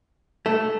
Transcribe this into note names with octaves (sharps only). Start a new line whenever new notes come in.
A3